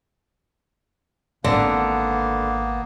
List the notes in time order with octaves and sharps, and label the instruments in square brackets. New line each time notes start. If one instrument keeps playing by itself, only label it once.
[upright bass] G#1 [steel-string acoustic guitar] D3 [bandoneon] A#3 B3